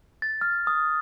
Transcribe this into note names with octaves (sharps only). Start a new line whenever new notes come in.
A6
F6
D#6